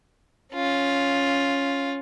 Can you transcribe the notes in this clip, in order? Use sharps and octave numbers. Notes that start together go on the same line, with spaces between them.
C#4 F4